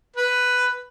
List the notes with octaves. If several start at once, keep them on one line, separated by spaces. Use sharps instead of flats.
B4